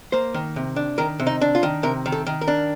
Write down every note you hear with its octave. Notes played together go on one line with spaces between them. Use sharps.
A#3 C5
D#3
C3
D4
D#3 A#4
C3
D#4
D4
F4
D#3
C3 A#4
D#3
A4
D#3
A#4
D4